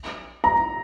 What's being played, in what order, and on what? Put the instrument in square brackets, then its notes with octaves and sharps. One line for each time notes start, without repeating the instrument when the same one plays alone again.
[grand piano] A#5